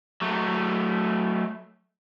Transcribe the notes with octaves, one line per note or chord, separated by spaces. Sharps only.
F#3 A3